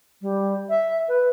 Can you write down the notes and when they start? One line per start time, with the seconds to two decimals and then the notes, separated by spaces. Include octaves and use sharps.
0.21 G3
0.69 E5
1.08 B4